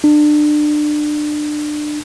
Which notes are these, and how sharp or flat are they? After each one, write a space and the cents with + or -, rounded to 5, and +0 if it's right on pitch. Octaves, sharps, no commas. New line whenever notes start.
D4 +25